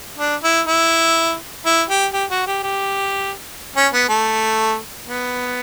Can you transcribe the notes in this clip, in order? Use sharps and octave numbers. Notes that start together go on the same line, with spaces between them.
D4
E4
E4
E4
G4
G4
F#4
G4
G4
C#4
B3
A3
B3